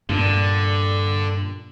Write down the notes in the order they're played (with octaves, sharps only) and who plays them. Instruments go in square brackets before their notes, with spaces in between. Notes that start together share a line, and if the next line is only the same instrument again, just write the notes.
[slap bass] G2 A#2 [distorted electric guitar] D3